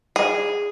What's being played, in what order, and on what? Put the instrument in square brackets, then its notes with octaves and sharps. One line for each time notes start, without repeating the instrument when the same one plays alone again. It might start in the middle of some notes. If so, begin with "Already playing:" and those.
[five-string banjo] G#4